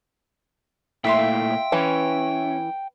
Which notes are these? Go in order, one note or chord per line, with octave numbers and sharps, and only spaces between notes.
A#2 A3 E4 E5 F5 G5 C6
E3 C#4